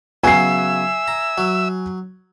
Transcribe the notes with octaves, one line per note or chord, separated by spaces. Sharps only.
C#3 F#3 B3 E5 G#5 E6 C7
A#5
F#3